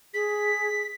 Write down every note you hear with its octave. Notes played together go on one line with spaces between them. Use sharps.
G#4 B6